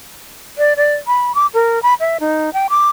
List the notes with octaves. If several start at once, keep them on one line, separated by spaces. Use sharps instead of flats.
D5
D5
B5
D6
A#4
B5
E5
D#4
G5
D6